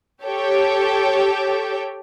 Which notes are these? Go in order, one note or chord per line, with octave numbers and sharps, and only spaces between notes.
G4 A4 C#5 G5